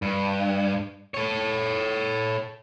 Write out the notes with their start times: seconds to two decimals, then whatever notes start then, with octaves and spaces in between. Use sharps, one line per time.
0.02 G2
1.14 A4 C#5